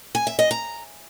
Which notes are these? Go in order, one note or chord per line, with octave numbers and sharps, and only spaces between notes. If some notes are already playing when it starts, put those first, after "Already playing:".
G#5
E5
D#5
A#5